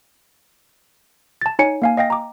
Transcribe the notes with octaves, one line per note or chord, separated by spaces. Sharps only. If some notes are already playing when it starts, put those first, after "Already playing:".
A5 A6
D#4 C#5 G#5 C#7
A#3 F5 G#5
D#5 F5 G5 A#6
A#5 D6